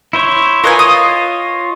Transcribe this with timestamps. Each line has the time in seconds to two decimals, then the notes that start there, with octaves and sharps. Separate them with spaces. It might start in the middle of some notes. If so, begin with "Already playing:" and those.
0.13 E4 C5 C#5
0.64 F4 A#4 B4 C#5 D#5 G#5
0.79 D#6